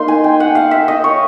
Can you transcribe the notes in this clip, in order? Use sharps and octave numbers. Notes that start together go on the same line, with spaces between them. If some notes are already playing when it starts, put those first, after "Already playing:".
Already playing: A#3 D#4 C6
G#5
G5
F#5
F5
E5
D#5
C#5